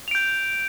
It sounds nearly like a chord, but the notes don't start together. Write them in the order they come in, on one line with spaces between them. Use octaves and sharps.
F7 D7 G6